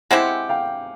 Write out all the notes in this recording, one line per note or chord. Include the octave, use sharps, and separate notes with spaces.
G#3 C4 E4 G4 F#5 G#5
F5 G5